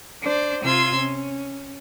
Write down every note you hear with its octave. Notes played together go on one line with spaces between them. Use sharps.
D4 C5 D5
C3 F4 C6 E6 G#6
C#4